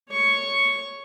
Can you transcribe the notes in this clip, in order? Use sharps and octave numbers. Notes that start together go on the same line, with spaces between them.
C#5 C#6